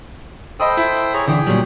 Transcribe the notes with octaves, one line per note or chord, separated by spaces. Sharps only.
A4 C5 D#5 G5 B5 D#6
E4
G#4 C#5 A#5
D3 E3 G#4 G5
A#2 F#3 G3